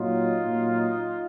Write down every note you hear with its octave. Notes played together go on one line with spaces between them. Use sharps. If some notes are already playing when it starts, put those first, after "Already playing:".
Already playing: A#2 F#3 D#4 F4
A#2 F#3